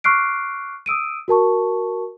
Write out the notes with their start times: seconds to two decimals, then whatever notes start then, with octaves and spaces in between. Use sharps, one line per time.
0.04 C#6 D6 F6 F#6 C7 D7
0.86 D#6 E6 D7 D#7
1.28 F#4 A#4 A5 C#6